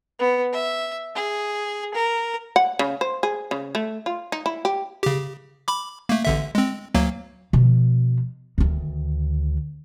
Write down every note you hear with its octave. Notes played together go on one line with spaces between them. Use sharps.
B3
E5
G#4
A#4
F#5
C#3
C5
G#4
C#3
A3
F4
D#4
E4
G4
C#3 G4
B5 D6
A3 A#3
A1 D3 E5
G#3 C4
D2 F#3 A#3
B2 F3
D2 D#3